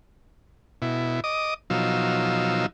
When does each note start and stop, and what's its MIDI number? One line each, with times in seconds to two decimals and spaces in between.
0.82 1.20 47
0.82 1.20 64
1.24 1.54 75
1.24 1.54 86
1.24 1.54 87
1.70 2.66 47
1.70 2.66 53
1.70 2.66 54
1.70 2.66 63
1.70 2.66 77
1.70 2.66 88